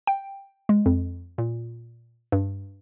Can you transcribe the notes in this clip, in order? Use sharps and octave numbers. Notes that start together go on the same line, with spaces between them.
G5
G#3
F2
A#2
G2